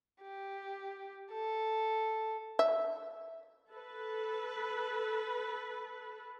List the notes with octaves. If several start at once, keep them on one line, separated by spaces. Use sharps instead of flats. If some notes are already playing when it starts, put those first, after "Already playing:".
G4
A4
E5
A4 B4